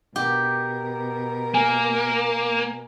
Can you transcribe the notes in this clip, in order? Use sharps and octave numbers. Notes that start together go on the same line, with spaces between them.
B2 G4 A#4
A#3 G#5